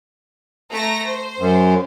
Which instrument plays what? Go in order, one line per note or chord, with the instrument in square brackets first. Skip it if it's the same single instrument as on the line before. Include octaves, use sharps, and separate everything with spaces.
[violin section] A3 A#5 A#6
C5
[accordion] F#2